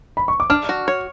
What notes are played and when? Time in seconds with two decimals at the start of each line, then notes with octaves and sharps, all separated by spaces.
0.17 B5
0.28 C#6
0.40 D6
0.50 D4 F6
0.69 F#4
0.88 C#5